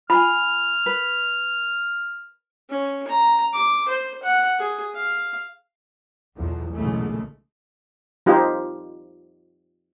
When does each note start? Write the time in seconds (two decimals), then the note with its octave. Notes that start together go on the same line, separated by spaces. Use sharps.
0.10 F4 G#5 B5 F6
0.86 B4
2.70 C#4
3.08 A#5
3.53 D6
3.89 C5
4.23 F#5
4.59 G#4
4.95 F5
6.37 B1 E2 B2 F3
6.74 B1 E2 A#2 C#3 G#3 A3
8.26 F3 D#4 F4 G4